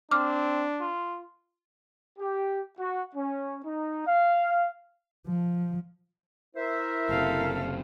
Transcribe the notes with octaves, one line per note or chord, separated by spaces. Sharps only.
C4 D4 D6 F6
F4
G4
F#4
C#4
D#4
F5
F3
E4 A#4 C5 E5
F#1 C3 A4 F5